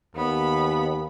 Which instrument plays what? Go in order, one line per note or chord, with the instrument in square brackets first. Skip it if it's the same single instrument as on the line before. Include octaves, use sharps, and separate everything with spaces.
[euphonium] D#2 [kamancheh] B3 B5